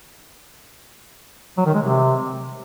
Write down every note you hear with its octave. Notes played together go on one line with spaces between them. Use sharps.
F#3
D#3
G#3
C3